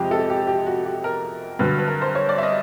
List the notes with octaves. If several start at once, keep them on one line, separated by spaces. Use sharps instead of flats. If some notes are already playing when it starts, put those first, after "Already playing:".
Already playing: F2 C3 F3 G#3 G4
A4
G4
G4
F#4
G4
A#4
G2 D3 F#3 B4
B4
A#4
C5
C#5
D5
E5
D#5